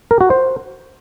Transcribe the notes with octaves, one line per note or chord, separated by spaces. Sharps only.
A#4
F#4
C5